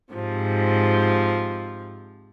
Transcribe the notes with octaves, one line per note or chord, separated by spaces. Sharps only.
G#2 C3 F3